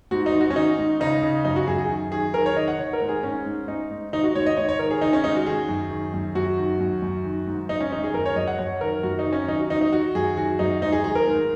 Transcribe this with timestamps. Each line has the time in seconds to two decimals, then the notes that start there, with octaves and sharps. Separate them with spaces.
0.11 G#2 F#4
0.26 D#4
0.34 D#3
0.41 F#4
0.50 C#4
0.56 D#3 D#4
0.78 G#2
1.00 C#3 D#4
1.22 C#3
1.45 F#2 D#4
1.56 F#4
1.67 F#2 G#4
1.78 G#4
1.89 D#3
2.11 D#3 G#4
2.34 D#3 A#4
2.46 C#5
2.56 D#3 D#5
2.68 F#5
2.79 D#3 C#5
2.93 A#4
3.02 G#2
3.09 G#4
3.23 G#2 C#4
3.46 G#2
3.68 G#2 D#4
3.91 G#2
4.12 D#3 D#4
4.24 F#4
4.35 G#2 C#5
4.46 D#5
4.57 G#2 C#5
4.69 C#5
4.79 D#3 A#4
4.91 G#4
5.01 D#3 D#4
5.13 C#4
5.24 G#2 D#4
5.36 F#4
5.46 D#3 G#4
5.69 F#2
5.91 D#3
6.14 F#2
6.35 F#2 F#4
6.58 D#3
6.80 F#2
7.02 F#2
7.25 D#3
7.47 G#2
7.69 G#2 D#4
7.81 C#4
7.92 D#3 D#4
8.04 G#4
8.14 F#2 A#4
8.26 C#5
8.36 F#2 D#5
8.47 F#5
8.59 F#2 C#5
8.81 D#3 A#4
9.03 F#2 F#4
9.19 D#4
9.25 D#3
9.32 C#4
9.48 D#3 D#4
9.59 F#4
9.70 D#3 D#4
9.81 D#4
9.93 D#3 F#4
10.15 F#2 G#4
10.37 D#3 F#4
10.59 F#2 D#4
10.82 G#2 D#4
10.92 G#4
11.04 D#3 G#4
11.15 A#4
11.27 G#2